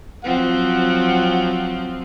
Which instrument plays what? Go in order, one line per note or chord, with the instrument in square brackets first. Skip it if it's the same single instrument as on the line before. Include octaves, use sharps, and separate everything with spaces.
[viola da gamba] F3 F#3 C4 [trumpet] F#5